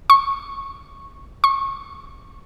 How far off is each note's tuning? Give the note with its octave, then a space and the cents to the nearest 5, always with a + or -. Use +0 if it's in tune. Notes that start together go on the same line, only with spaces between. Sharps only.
C#6 -15
C#6 -25